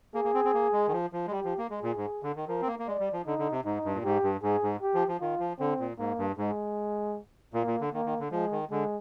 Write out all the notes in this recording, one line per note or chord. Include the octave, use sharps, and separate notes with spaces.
A#3 G#4
A#3
C4
C4
A#3
G#3
D#3
F3
F3
G#3
G3 G4
F3
A#3
G#3 G#4
A#2
G#2
D3
D#3
F3 A#4
C4
A#3
A#3
G#3 D5
G3
F3
D3 D#4
D3
C3
G#2 D#4
G2
A#2
G#2 G4
G2
G#2 G#4
G#2
G4
F3
F3
D#3 F4
F3
D3 C4
A#2
G#2 A#3
G2
G#2 G#3
A#2 A#3
A#2
D3
D#3 A#3
D#3
D3
F3 G#3
D#3
D3 G#3